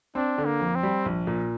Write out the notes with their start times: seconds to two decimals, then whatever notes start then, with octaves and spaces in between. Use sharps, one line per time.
0.15 C4 D4
0.38 D3
0.46 A#3
0.60 F2
0.75 C4
0.83 G3
1.06 A#1
1.27 A#2